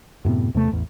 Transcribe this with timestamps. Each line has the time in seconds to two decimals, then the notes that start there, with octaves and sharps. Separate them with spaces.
0.25 F#2 A2 C3 B3
0.54 E2 C3 A3
0.72 A1 E2